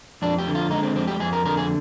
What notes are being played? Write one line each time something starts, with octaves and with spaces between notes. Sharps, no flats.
F2 D4
G4
D3
F4
G#3 D#4
C4
F2 C4
G4
F2 G#4
A#4
D3 A#4
G#4